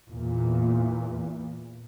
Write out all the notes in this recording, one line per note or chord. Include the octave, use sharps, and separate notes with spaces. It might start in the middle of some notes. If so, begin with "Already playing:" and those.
E2 A#2